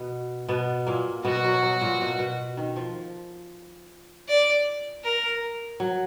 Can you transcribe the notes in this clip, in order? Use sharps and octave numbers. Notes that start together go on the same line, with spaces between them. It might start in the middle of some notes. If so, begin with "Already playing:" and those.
Already playing: B2 B3
B2 B3
A#2 A#3
B2 B3 F#4
F#3
F#3
A#2 A#3
B2
B2
D#3
F3
D5
A#4
F#3